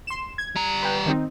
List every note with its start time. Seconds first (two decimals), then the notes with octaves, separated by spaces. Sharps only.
0.07 C6 E7
0.38 G#6
0.56 G3 A#5
0.82 B4 G5
1.06 D#3 C4 D#4